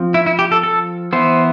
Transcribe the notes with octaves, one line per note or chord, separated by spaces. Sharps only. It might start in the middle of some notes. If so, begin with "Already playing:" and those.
Already playing: F3 C4
E4
E4
G4
A4
A4
E3 B3 C5